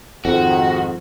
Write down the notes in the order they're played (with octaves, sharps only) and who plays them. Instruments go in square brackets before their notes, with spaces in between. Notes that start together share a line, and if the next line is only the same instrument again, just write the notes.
[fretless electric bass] F2 [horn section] G#2 D#3 [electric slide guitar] F#4